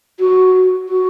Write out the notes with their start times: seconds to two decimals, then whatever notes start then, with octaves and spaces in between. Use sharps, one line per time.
0.20 F#4
0.89 F#4